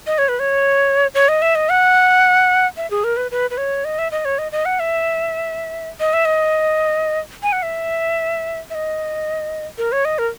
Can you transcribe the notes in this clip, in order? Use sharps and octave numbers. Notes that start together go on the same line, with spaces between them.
D#5
C#5
B4
C#5
C#5
D#5
E5
D#5
F#5
E5
G#4
A#4
B4
B4
B4
C#5
D#5
E5
D#5
C#5
D#5
D#5
F#5
E5
D#5
E5
D#5
G#5
F#5
E5
E5
D#5
A#4
C#5
D#5
A#4